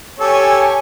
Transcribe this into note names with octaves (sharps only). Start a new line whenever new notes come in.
G4 A4 C#5 G#5